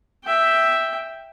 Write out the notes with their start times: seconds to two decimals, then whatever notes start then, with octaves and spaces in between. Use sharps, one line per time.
0.25 E5 G5